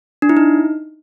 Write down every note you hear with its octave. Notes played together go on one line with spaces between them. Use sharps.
D4
E4
D#4